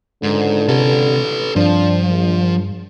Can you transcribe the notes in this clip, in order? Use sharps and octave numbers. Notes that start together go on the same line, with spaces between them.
C#2 G#2 D3
C3 A4 B4
G2 F3 C4 D4
A#1